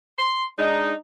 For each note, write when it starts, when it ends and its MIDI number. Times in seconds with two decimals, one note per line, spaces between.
0.19 0.46 84
0.59 0.94 56
0.59 0.94 62
0.59 0.94 63